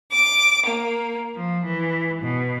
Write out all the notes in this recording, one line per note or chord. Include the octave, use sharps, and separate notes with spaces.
D6
A#3
F3
E3
B2